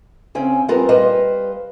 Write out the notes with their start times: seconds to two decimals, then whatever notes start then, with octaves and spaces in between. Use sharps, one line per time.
0.35 C#3 C4 C#4
0.69 G3 B3 C4 F4 A#4 C5
0.89 G3 B4 C5 D#5 F5